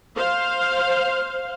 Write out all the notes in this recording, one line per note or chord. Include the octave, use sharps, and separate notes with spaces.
C5 F5